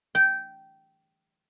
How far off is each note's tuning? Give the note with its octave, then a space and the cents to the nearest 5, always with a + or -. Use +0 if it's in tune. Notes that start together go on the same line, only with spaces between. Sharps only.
G5 -15